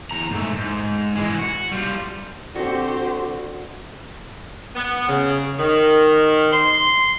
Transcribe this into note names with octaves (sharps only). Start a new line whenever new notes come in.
E2 A#5
G#2 A3
G#2
E3 G#3
F#4
G3 F4
D3 C4 F#4 G4 C5
B3
C#3
D#3
C6